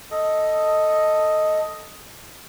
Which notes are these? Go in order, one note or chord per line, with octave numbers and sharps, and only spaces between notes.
A4 D#5